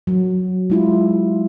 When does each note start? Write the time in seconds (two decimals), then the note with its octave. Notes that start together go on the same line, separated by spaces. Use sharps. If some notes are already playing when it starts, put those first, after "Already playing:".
0.07 F#3
0.70 G#3 E4 F4